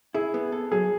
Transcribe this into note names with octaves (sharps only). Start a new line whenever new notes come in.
E4 G#4
B3
A4
F#3 G#4